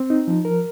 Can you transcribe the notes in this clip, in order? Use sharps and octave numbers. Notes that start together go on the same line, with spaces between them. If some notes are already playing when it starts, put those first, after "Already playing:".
Already playing: C4
D#4
F3
A#4